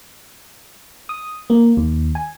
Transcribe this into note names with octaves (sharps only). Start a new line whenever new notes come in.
D#6
A#3
D#2
G#5